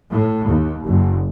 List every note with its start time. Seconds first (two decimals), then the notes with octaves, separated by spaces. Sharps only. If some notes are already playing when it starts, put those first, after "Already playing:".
0.12 A2
0.46 D#2
0.85 F#1